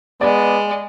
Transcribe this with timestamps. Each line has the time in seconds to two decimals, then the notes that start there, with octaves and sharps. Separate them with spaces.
0.21 G#3 B3 D5